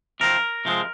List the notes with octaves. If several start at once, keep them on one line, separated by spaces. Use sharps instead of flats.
C3 F3 C4 A#4
C3 F3 G#3 C4